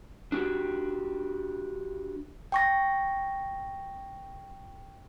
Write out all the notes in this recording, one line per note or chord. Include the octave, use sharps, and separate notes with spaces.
D4 F#4 G4
G5 C#6 A#6